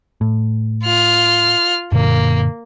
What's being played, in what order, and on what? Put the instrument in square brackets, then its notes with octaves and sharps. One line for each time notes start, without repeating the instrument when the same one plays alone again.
[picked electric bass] A2
[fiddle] F4 F6
[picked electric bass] F#2 A#2 D3 [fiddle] A#3